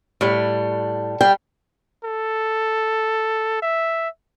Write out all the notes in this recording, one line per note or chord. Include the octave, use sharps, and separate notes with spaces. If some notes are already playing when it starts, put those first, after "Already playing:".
A2 G3
G3 G5
A4
E5